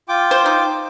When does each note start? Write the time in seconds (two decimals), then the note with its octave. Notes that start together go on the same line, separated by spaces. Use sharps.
0.09 F4 G5 D6
0.31 C5
0.46 D#4